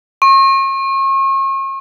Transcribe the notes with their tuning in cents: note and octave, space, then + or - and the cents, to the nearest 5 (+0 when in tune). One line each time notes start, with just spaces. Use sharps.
C#6 -40